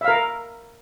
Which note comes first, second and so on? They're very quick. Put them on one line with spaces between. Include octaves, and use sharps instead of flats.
E5 F5 A#4